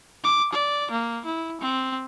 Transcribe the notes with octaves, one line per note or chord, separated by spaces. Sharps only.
D6
D5
A#3
E4
C4